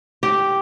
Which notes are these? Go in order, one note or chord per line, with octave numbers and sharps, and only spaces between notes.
G4